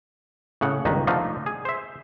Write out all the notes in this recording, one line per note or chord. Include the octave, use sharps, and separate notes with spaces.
A2 C#3 F#5
G1 C#2 D#3 D#4 B4
D3 F3 A3 D#4 F4
G#4
C5 E5